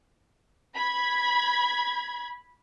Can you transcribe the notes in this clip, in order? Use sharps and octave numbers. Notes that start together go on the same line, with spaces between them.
B5 G#6